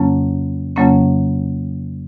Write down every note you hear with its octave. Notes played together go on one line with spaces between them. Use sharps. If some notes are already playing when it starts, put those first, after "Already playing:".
Already playing: F2 C#3 F#3 A#3 C#4
F2 C#3 F#3 A#3 C#4